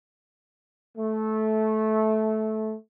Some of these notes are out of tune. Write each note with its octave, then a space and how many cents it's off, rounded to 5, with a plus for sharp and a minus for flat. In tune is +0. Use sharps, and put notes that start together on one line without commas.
A3 -15